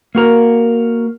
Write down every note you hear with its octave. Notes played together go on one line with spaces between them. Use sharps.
A#3 F#4 A#4